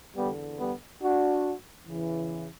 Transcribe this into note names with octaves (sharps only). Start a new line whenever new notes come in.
E2 D3 G3 B3
G3 B3
D4 F#4
E2 C#3 E3